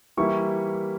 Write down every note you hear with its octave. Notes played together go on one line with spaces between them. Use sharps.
E3 G3 A#3 E4 C#6